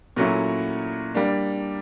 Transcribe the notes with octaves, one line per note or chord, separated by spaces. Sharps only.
A#2 F#3 A3 C#4 E4
G3 A#3 D4